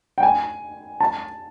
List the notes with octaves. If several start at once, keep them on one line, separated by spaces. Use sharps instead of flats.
G5
G#5
A5